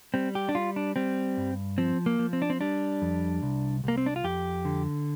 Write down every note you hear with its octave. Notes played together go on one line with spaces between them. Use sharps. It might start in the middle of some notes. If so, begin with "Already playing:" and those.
G3 C4
G4
D4
G3 F4
D4
G3 C4
G2
F3 C4
A#3
F3
C4
D4
C4
G3 D4
F2
C2
C2 A#3
C4
D4
F4
F2 G4
D3